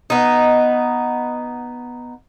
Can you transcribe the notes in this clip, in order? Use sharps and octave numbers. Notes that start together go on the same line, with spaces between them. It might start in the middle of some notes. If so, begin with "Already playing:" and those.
B3 D#4